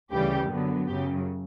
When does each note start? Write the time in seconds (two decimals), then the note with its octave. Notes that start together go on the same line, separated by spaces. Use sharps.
0.11 D2 C#3 E3 G3 G4
0.49 F#2 D3 F#3 B3
0.87 F#2 C#3 F#3 G4